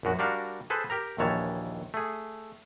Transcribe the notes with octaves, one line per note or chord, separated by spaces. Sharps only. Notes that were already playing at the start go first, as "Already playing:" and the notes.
A#1 F#2 F#4
G3 D4 F#4 A#4 F5
G#4 A4 B4 C5
G4 A#4 A#5
A#1 D#2 D#3 E3 C#5 A5
A3 G#4